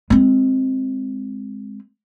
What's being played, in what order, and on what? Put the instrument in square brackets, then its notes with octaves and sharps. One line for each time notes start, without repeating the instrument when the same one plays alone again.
[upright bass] G#3 C4